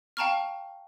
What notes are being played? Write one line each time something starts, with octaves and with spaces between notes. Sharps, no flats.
F5 G5 A5 A#5 C#6 F6